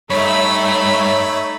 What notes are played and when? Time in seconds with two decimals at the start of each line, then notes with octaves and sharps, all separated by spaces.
0.10 G2 A3 D#4 C#5 E5 B5